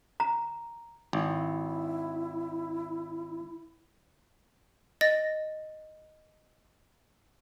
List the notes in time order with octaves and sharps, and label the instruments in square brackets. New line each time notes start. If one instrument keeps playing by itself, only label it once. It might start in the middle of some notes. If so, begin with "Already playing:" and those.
[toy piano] A#5
[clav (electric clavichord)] G#1 [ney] E4
[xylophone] D#5 A6 A#6